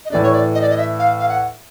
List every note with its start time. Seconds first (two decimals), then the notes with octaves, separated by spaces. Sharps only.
0.05 D#5
0.10 A2 E3 A3 D4 D5
0.23 C#5
0.33 D5
0.54 D#5
0.62 D5
0.70 D#5
0.78 E5
0.99 F5
1.19 F5
1.29 F#5